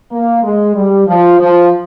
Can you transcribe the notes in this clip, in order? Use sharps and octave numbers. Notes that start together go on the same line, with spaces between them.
A#3
G#3
G3
F3
F3